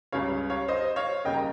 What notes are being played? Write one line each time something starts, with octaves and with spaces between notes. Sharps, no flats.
C#2 C#3 G3 C#5 F5
C#5 F5
C5 D#5
C#5 F5
D#2 C#3 G3 D#5 G5
A#5